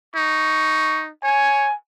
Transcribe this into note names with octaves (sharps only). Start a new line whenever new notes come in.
D#4 C#6
C#5 G#5